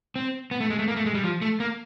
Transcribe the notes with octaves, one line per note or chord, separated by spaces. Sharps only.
C4
B3
A3
G#3
A3
A#3
A3
G#3
G3
F3
A3
A#3